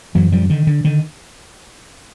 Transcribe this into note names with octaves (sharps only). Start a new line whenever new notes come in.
F#2 E3 F#3
F3 G3
D3 D#3
D3
D3 D#3